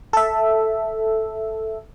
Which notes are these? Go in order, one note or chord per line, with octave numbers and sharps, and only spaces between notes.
A4 E5